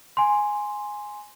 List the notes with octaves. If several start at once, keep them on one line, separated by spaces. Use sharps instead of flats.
G#5 C6